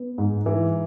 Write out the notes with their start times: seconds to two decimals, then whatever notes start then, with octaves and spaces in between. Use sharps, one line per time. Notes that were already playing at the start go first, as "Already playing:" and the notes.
Already playing: B3
0.18 G#2
0.46 E3